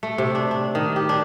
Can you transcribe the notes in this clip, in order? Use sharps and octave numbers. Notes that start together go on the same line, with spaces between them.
A3
C3
D4
D4
D#3
G4
D4